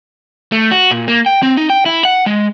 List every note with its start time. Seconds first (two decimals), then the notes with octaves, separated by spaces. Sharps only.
0.52 A3
0.71 F#4
0.91 A#2
1.08 A#3
1.26 G5
1.43 C4
1.57 D#4
1.70 G5
1.86 E4
2.05 F#5
2.26 G#3